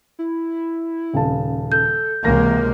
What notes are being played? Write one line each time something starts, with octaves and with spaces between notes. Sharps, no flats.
E4
D#1 C#3 A5
A4 G6
C#2 C3 E3 A#3 A#6